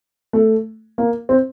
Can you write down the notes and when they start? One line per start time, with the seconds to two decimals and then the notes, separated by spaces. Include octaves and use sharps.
0.33 A3
0.98 A#3
1.29 C4